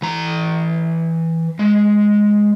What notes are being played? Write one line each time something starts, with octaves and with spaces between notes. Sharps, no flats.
E3 A#5
G#3